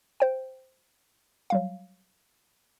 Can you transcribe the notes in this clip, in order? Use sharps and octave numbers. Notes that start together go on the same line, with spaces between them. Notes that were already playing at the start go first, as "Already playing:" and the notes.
C5 G5
F#3 G3 F5